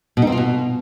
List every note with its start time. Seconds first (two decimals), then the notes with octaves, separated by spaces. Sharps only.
0.17 B2
0.22 D#4
0.27 C4
0.32 F4
0.37 B2